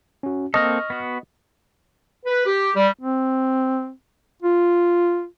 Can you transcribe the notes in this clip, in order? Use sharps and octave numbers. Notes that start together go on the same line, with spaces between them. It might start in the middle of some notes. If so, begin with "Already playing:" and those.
C#4 F#4
A#3 C4 A4 D#5 C#6 F6 A#6
B3 F#4
B4
G4
G3
C4
F4